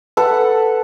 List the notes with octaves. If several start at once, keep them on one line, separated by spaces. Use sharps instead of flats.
A4 B4 F#5